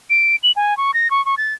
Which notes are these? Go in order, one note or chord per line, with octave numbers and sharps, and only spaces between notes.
D7
F#7
G#5
C#6
A#6
C#6
C#6
A6